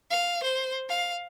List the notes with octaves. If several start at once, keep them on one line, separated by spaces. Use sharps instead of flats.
F5
C5
F5